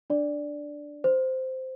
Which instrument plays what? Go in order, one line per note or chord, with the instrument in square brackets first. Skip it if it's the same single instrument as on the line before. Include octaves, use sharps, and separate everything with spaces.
[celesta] D4 D5
C5